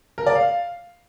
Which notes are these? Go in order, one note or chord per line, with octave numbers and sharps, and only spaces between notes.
A#4
D5
F5